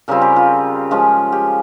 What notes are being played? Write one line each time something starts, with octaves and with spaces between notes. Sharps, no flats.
C#3 G3 C4 F4 A#4
G4
F4
F3 G#3 C#4 F4
G4